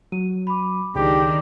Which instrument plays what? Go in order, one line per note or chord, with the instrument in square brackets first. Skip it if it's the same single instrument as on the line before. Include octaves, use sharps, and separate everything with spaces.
[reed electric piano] F#3 [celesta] D#7
[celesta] B5 D6
[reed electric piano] C#2 [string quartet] D#3 D4 [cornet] G4 [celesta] G#4 D6